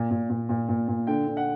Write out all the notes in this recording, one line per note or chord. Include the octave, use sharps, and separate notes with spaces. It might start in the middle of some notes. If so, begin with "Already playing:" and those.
Already playing: A#2
A#2
A#2
A#2
A#2
A#2
D3 G5
D3
F#5